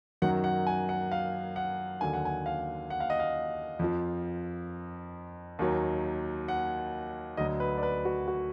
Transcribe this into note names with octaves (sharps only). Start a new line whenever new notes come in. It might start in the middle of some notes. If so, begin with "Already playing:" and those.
F#2 D#3 F#3 F#5
F#5
G#5
F#5
F5
F#5
D#2 D3 F#3 G#5
F#5
G#5
F5
F#5
F5
D#5
F5
F2 F3
D#2 D#3 F#3
F#5
D2 D3 F#3 D#5
B4
D5
B4
F#4
F#4